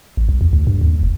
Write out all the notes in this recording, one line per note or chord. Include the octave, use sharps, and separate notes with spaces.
A1
C2
E2
D2
G2
D#2
F1